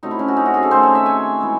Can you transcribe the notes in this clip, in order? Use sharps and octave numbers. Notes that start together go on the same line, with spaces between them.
C3 F#3 A3 D#4
E4
C#4
F#4
D#4
F#4
G#4
A4
D#3 A3 C4 C5
C#5
E5
G#5
E3 G#3